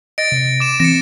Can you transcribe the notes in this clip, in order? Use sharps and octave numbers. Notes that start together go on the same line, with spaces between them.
D#5 A6 A#6 D7
C3 C#7
D6 E7
E3 C4 A#6 C#7